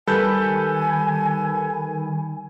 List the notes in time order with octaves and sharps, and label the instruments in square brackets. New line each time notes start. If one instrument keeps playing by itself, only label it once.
[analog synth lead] D#3 [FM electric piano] G3 B5 [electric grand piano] A4 B4 G6 [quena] G#5